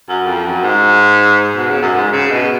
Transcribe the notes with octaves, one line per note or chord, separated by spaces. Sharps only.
F#2
F2
F#2
G#2
B2
C#3
F#2
G#2
C#3
B2